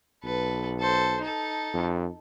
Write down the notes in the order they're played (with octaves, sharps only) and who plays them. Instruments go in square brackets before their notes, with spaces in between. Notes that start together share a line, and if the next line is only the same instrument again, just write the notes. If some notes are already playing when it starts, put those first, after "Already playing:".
[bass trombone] B1 [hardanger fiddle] A4 B4
[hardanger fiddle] A4 C5
D#4 A4
[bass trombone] F2